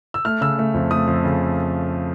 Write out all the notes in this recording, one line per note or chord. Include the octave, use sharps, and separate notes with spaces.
E6
A3 F6
C#3 E6
A3
F2
A3 D#6
F2
C#3